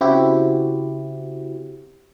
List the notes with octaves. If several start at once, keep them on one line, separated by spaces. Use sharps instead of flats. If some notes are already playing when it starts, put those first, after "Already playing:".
C#3 C4 E4 F#4 G4